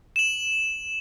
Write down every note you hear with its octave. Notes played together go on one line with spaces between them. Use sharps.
E7 F#7